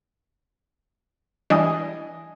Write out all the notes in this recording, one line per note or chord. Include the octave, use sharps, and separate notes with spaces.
E3 G3 D4 D#5 G#5 D#6